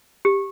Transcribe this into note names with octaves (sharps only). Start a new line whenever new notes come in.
G4